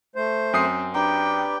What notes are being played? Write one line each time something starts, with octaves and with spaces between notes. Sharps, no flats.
A3 C5
F#2 C4 G#5 D#6 C7
D4 G4 B4 D5 G5 A#5 D6